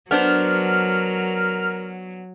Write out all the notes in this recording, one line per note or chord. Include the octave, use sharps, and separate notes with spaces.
F#3 B3 D4 A#4 C5 F6